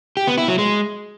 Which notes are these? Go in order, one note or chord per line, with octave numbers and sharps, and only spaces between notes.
G4
B3
E4
F#3
G#3